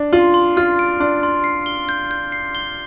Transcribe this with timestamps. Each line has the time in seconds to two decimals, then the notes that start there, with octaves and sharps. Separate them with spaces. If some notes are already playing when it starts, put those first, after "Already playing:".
Already playing: D4
0.13 F4 C6
0.34 C6
0.57 F4 F6
0.79 D7
1.00 D4 C6
1.23 C6
1.44 C7
1.66 G7
1.89 G6
2.11 G6
2.32 C7
2.55 G7